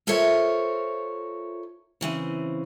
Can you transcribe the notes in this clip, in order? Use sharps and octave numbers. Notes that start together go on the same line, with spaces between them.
F4 A4 A#4 C5 C#5 E5
C#3 E3 C4